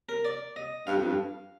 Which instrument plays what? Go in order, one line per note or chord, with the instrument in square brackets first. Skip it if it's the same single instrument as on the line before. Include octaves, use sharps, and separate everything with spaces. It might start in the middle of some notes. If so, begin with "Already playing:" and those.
[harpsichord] A#4
D5
D#5
[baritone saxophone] G2 [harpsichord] F5
[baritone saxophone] F2
G2